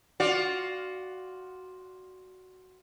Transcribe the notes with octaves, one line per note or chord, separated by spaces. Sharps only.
F4 F#4 D5